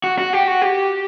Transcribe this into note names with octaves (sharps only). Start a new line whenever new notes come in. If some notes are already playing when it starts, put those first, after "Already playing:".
F#4
F#4
G4
F#4
G4